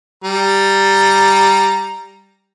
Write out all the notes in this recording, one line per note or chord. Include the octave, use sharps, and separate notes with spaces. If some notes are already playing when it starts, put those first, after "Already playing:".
G3 A#5